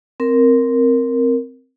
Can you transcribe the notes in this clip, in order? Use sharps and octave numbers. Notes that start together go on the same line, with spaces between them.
C4 A#4